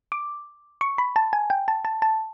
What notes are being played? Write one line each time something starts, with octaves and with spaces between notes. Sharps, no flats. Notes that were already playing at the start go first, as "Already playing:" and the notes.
D6
C#6
B5
A5
G#5
G5
A5
A5
A5